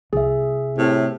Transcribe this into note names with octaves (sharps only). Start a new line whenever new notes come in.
C2 G#4 E5
A2 C3